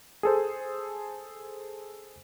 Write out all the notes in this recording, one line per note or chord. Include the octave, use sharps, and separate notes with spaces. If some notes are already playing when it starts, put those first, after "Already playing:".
G#4 A4 C5